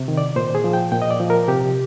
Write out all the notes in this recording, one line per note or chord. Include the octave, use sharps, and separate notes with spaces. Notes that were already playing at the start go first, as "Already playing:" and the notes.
Already playing: C3
D#3
D5
A#2 C5
G#4
F3
G5
A#2 G5
D#5
D5
F3
A#4
C3 G4